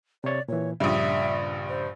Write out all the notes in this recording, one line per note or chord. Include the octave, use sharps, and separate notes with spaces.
C3 C#5 D5
A#2 E3 C#5
A#1 G2 C#3 D5 E5 D#6
C5